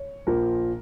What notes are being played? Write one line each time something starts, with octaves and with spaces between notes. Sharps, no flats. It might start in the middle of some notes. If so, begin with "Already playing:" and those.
Already playing: C#5
A#1 A#2 F3 A#4